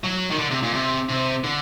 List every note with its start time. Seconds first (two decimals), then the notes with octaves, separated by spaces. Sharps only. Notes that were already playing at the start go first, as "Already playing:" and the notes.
0.04 F#3
0.31 D#3
0.39 D3
0.51 C3
0.63 A#2
0.74 C3
1.09 C3
1.44 D3